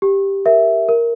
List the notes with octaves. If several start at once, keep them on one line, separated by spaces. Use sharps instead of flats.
G4
A#4 E5
A#4